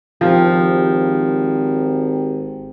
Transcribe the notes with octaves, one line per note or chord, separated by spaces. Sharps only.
G#1 F3 G4 G5